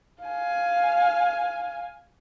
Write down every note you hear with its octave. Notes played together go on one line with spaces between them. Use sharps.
F5 G#5